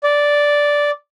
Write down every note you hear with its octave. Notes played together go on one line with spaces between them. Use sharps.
D5